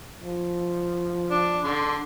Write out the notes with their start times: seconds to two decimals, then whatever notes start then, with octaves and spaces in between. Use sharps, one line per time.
0.23 F3
1.31 D4 D6
1.64 D3 C6